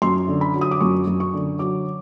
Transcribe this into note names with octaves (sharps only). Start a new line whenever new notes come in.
F#2 C6
D3
B5
F#3
D#6
D6
F#2 C#6
F#2
C#6
D3
F#3 D6